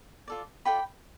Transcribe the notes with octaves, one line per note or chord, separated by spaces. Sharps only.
F4 A4 D5
F4 A4 D5 G5 B5